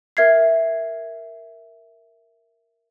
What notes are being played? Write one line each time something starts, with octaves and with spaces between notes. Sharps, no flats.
A#4 E5 G#6 C7